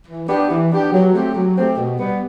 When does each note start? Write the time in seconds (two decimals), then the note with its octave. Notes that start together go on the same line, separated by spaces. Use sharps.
0.07 E3
0.28 B3 D4 G4
0.49 E3
0.70 B3 D4 G4
0.92 F#3
1.13 A3 C4 G4
1.34 F#3
1.56 A3 C4 G4
1.77 B2
1.98 G3 B3